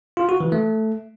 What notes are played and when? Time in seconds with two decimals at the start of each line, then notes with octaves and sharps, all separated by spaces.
0.17 F4
0.29 F#4
0.40 E3
0.52 A3